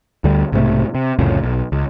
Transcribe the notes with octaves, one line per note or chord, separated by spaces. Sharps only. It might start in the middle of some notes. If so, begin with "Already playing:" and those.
D2 D3 G3
B1 G#2 C3 A3
C3
C2 F2 A2 C#3
B1
C#2